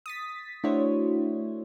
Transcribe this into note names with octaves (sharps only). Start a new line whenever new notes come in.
D#6 A6 B6
A3 D4 E4 F#4 C5 C#5